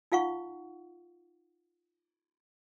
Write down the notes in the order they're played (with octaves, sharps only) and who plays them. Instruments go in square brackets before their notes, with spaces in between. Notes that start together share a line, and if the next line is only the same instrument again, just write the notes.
[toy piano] D#4 F4 F5 F#5 C#6